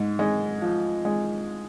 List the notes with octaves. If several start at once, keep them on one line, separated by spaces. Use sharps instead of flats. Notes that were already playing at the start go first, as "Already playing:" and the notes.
Already playing: G#2
G#3
F3
G#3